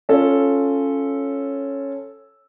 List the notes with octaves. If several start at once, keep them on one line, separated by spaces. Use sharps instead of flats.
C#4 F4 A4